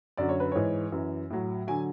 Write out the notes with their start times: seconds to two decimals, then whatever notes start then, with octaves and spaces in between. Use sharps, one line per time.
0.17 F#2 D3 F#3 D5
0.29 C#5
0.40 B4
0.52 G#2 E3 C#5
0.92 F#2 E3
1.30 A2 F#3
1.67 D3 F#3 G#5